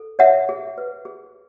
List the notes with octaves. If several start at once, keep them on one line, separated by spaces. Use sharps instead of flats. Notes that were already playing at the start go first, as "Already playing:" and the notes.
Already playing: A4
C#5 E5 F#5
G#4
B4
G#4